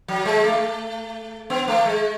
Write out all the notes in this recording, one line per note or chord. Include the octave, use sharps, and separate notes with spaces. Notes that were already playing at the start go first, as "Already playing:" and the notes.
F#3
G#3
A3
B3
A3
G#3